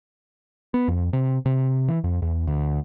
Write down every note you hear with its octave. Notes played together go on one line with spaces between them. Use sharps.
B3
F2
C3
C3
E3
F2
E2
D2